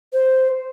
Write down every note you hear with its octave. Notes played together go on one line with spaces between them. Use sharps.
C5